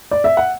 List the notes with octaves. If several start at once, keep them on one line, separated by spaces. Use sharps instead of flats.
D5
E5
F#5